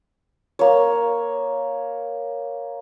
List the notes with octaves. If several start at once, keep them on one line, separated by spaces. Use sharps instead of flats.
A#3 C#5